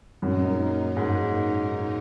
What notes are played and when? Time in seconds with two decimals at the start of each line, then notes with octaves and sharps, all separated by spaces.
0.22 F#2 A#2 G#3 D#4 A#4
0.96 G#2